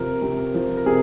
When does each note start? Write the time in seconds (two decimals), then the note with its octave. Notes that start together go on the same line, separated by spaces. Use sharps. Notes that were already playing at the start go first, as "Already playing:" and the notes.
Already playing: C3 F3 A#4
0.22 C3
0.54 F3
0.77 A#4
0.86 C3 G#4